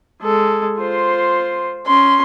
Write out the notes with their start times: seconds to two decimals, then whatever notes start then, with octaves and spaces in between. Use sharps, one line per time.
0.22 G#3 A4
0.79 F4 C5
1.87 C#4 C6